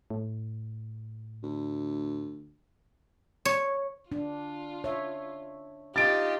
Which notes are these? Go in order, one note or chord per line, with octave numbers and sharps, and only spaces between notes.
A2
D2
C#5
D4 F4
C#5 E5
D#4 F4 G4 A6 D7